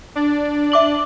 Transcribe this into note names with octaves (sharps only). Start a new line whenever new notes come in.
D4 D5
E5 D6 F#7